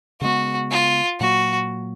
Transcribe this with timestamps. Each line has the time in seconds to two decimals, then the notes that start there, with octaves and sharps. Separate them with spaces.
0.21 C#3 G#3 B3 F#4
0.71 F4
1.20 A#2 F#3 A#3 F#4